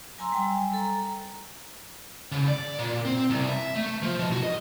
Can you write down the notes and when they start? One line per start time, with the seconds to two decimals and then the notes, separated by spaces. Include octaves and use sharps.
0.18 F#3 G#5 A#5 C6 E6
0.32 G3 G5 G#5
0.74 A4 A#5
2.32 C#3
2.48 D5
2.79 A#2
3.05 C4
3.30 C2
3.49 E5
3.75 A3
4.03 F3
4.19 B2
4.32 F#4
4.43 D#5